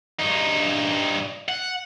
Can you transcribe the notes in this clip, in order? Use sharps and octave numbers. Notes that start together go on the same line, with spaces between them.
G2 D#4
F#5